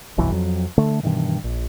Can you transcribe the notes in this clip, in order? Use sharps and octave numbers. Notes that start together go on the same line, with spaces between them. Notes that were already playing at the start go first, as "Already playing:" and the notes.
F1 B1 G2 E3
F2 F#3
D3 A3
G2 B2 D#3 E3
A#1